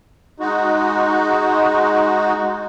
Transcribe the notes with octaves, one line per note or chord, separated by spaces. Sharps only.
G#3 D#4 F#4